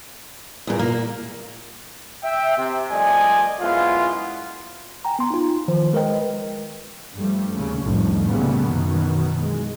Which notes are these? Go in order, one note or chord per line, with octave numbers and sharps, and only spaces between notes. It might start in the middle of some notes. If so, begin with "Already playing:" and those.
E2 A#2
A#2 A#3 A#4
E5 G5
C3
C2 F3 A3 D5 D#5 G#5
F#2 G#3 B3 E4 F4
G5 G#5 A#5
B3 C6
D#4 F4
D#3 F3 F4 C5
G#3 A#4 B4 D#5 G5
G2 F3 G3 A3
D#2 C#3
C2 F2 A2 D3 D#3 F3
A#2 C#3 G3 A3 B3
F#2 B2 D#3 E3 F#3
G#3